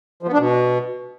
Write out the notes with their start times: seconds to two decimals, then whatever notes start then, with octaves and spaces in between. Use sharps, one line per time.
0.23 F3
0.28 B3
0.33 D4
0.38 B2